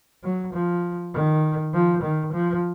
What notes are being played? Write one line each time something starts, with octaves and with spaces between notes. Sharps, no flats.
F#3
F3
D#3
F3
D#3
F3